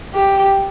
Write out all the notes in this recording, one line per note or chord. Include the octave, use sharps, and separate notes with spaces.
G4